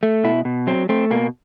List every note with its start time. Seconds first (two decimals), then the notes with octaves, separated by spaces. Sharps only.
0.03 A3
0.24 B2 E4
0.45 B2
0.67 F#3 C4
0.89 A3 C4
1.11 B2 A#3